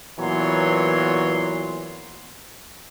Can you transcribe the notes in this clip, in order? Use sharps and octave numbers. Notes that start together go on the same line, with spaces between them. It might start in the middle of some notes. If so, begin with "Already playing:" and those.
A#2 E3 F#3 B3 C#5 C6